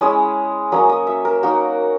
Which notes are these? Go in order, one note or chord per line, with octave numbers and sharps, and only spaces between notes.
G#3 C#4 E4 D#5
F#3 A#3 C#4 D#5
D#5
E5
A#4
A#3 D#4 F#4